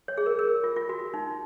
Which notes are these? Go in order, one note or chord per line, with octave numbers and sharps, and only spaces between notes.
C#5
G#4
A#4
A#4
F4
F4
F#4
D#4